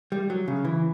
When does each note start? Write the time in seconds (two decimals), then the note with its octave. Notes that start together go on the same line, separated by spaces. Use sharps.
0.12 G3
0.30 F#3
0.48 C#3
0.65 E3